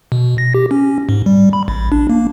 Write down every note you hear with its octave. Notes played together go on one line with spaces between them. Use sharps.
B2
A#6
G4
C#4
G#2
G3
B5
A1
D4
A#3